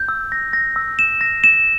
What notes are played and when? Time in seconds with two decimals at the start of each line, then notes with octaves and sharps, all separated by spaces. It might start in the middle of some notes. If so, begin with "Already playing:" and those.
Already playing: G6
0.08 E6
0.32 A#6
0.53 A#6
0.76 E6
0.99 E7
1.21 A#6
1.44 E7